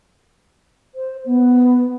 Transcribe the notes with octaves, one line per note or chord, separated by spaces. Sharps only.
C5
B3